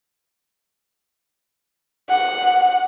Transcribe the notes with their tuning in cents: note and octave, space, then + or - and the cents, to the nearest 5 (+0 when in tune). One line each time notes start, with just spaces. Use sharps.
F#5 +0